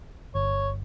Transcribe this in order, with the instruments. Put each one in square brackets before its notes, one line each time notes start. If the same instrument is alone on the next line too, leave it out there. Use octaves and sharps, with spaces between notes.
[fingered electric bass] G1 [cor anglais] C#5